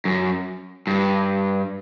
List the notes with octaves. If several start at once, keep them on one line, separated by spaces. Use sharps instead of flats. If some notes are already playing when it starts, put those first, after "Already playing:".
F#2
G2